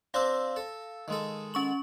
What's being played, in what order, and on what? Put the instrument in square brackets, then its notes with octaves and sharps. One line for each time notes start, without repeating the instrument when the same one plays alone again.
[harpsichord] C4 D4 C5 [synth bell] F5 E6
[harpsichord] A4
D#3 G#3 A4
[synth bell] C#4 C#6 F#7